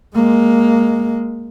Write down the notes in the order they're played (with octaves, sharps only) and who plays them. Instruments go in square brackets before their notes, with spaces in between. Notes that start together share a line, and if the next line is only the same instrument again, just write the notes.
[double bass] G#3 A#3